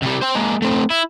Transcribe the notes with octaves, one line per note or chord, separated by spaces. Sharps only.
C3 G3
C5 G5
G#3 A#3
A3 C4
E4